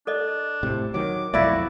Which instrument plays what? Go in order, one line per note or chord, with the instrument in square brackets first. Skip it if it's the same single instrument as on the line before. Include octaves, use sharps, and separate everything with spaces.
[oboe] D4 [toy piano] A4 D5 D#5
[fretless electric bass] A2 C3
[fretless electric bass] D#3 F#3 [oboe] D6
[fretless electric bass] B1 F2 [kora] E4 D5 [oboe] F#4 [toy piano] E5 F5